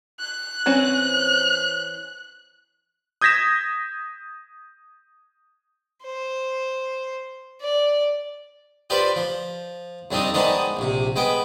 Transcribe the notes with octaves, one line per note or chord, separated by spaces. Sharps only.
F#6
E3 C4 C#4
D#6 G6 G#6 A#6 B6 E7
C5
D5
F4 G4 B4 C5 D5
F3
F2 G3 C4 D4 D#4
D#3 G#3 B3 D4 D#4 C5
A#1 C3
G#3 B3 G5